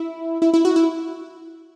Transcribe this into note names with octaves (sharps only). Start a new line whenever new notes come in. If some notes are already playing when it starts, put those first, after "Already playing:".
Already playing: E4
E4
E4
F#4
E4